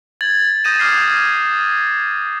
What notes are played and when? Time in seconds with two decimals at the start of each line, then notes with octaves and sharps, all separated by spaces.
0.21 G#6 A6 F#7
0.64 D#6 G6 A6 A#6 D#7 E7
0.80 D6 F6 C7
1.01 G#6